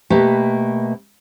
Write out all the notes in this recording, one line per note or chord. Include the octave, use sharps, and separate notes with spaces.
B2 A3 A#3 G4 B4